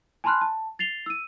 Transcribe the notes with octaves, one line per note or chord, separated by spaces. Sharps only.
G#5 A5 B5 C6 F6 F#6
A5
A6 C7 F7 G7
E6 D#7